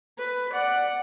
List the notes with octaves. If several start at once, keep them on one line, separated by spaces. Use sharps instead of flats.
B4
D5 F#5